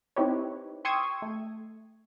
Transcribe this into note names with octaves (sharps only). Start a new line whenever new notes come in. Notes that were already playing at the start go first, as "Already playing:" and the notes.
C4 D#4 E4 G4 B4 C#5
G5 C6 C#6 D#6 E6 G#6
A3